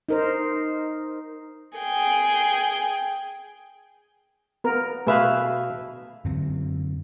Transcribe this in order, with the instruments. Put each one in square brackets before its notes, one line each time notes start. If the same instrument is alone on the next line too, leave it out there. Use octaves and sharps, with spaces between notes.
[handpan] D#4 A#4 C5
[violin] G#4 G5
[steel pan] B3 A#4
[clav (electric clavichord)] B2 E5 F5 [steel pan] A3 G#4 B4
[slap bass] F#2 D3 C4